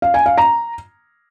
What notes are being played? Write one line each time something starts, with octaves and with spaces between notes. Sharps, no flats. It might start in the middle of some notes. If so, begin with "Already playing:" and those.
F5
G#5
F5
A#5